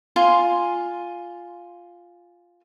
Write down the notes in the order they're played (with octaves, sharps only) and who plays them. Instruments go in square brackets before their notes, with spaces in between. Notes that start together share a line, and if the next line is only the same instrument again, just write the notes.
[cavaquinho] F4 G#5 C6